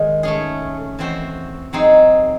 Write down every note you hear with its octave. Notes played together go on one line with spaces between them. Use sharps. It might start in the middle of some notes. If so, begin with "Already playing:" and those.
Already playing: D#3 G#3
A3 C#4 G#4
E3 C4 F#4 C5
F#3 C4 D#4 G#4